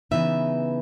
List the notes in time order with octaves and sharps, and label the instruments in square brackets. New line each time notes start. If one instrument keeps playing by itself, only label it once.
[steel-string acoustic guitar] C#3 E3 B3 D#4 E5